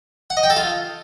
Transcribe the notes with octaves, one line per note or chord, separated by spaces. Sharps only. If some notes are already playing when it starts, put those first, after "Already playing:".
F#5
D#5
G5
A4
F4